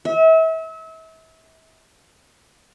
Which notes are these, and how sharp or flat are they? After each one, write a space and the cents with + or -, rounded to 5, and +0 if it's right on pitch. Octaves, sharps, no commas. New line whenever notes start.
E5 -35